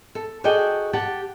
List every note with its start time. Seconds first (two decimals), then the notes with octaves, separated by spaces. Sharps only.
0.15 A4
0.44 F#4 G#4 A4 D5 D#5 G5
0.93 G4 F#5 A5